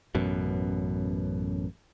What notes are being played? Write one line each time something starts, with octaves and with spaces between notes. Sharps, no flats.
A1 F#2 B2